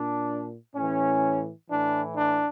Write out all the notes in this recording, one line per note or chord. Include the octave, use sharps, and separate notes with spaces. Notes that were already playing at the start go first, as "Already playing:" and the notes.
Already playing: A#2 D4
A2 E3 C#4
A2 E3 D4
D4